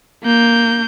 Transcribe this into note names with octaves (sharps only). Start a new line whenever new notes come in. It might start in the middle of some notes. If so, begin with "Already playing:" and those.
A#3 G6